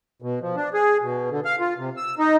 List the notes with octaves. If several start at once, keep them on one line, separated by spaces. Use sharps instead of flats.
B2
F3
D4
G#4
B2
D3
F5
F4
C3
E6
D#4